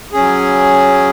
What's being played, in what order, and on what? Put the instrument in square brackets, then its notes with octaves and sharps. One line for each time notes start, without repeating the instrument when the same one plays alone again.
[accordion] F#3 C#4 G#4